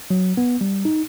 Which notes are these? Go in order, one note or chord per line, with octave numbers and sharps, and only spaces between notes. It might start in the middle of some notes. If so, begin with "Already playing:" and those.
F#3
B3
G3
D#4